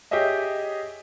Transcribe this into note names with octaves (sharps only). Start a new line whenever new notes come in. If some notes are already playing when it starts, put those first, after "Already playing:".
G4 G#4 C#5 D#5 E5